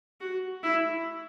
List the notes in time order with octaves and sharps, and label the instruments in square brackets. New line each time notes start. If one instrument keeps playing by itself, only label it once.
[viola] F#4
E4